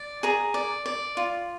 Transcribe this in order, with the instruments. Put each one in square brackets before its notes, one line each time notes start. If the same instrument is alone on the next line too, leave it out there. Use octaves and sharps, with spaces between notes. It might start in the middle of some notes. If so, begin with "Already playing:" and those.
Already playing: [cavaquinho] D5
G#4 A#5
D5
D5
F4